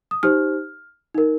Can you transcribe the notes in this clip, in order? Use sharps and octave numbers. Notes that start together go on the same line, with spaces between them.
D#6
D#4 G4 C5 F6
D#4 A#4